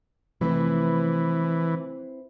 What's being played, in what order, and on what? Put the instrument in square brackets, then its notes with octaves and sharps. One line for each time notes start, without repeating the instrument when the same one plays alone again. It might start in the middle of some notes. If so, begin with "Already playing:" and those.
[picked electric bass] C3 F3 A3 [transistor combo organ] E3 [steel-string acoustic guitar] C4 E4 B4